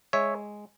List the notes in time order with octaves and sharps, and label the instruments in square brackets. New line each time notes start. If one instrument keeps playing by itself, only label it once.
[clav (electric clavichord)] G#3 C#5 E5